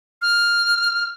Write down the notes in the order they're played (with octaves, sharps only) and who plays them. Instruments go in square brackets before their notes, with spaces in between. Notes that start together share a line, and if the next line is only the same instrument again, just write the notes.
[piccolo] F6